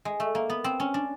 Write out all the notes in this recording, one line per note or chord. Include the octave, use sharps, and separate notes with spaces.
G#3
A3
A#3
B3
C4
C#4
D4